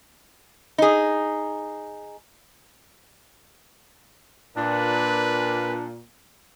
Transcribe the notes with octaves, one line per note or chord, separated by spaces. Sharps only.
D#4 G#4
A#2 D4 B4